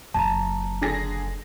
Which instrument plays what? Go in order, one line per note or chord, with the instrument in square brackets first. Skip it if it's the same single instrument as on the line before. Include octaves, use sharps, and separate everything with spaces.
[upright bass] F#1 [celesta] A5 A#5
[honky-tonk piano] D3 G#4 A#6